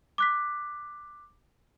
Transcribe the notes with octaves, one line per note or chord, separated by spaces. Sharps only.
D6 F#6 B6